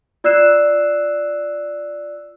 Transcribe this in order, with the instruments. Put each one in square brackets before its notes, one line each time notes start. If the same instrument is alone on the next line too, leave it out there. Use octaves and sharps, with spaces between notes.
[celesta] F4 D5 E6 F#6 C7 E7